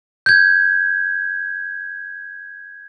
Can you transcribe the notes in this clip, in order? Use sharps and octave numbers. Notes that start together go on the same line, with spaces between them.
G6 G#6